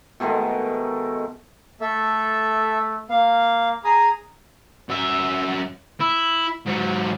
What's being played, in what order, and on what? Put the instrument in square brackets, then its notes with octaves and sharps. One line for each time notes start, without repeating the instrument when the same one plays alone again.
[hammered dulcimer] B2 D#3 G#3 A3
[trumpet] A3 [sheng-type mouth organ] A4 E5
[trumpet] A#3 [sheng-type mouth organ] F5
[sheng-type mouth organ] G#4 G#5 D#6 [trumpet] A#5
[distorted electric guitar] F#2 E5
E4
G#2 F#3